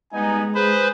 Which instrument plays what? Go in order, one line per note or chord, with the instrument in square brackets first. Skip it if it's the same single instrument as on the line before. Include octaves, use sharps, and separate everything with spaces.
[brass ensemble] G3 B3 D#4 [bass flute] G#3 [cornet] G#5
[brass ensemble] G#4 [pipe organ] B4 C5 [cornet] B5